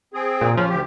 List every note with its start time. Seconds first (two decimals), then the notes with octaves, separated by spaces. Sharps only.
0.14 C4 G#4
0.41 A#2
0.57 F3 C#4
0.69 D2 G4